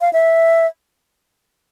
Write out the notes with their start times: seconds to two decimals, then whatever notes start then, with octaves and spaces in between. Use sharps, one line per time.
0.01 F5
0.13 E5